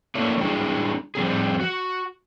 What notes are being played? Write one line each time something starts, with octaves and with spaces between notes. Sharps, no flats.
A3 A#3 C#4 D4 E4 C#5
G3 D4 E4 F#4 G#4
F3 G3 C4 G#4
F#4